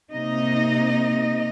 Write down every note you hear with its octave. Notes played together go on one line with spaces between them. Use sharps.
C3 A#3 D#4 D#5